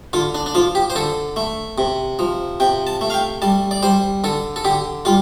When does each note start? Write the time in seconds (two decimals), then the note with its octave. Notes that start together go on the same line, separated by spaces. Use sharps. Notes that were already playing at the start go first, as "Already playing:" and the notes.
0.13 D3 F4
0.35 D4
0.46 D4
0.55 F3 F4
0.75 G4
0.90 C5
0.95 D3 A4
1.36 A3
1.78 C3
2.19 F3
2.60 C3 G5
2.87 A5
3.01 A3
3.10 F5
3.14 G5
3.42 G3 A5
3.71 D5
3.83 G3 C5
4.24 D3 A4
4.56 A4
4.65 D3 G4
5.05 G3 F4